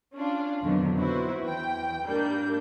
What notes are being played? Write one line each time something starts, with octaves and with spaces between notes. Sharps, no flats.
C#4 D4 F4
F2 B2 D3 D#3 F#3
B3 E4 F#4 B4 C5
E2 G5
G#2 G3 A#3 D4 G6